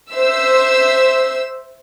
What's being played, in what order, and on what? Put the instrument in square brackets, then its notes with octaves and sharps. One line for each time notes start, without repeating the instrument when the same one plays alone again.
[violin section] C5 E5 E6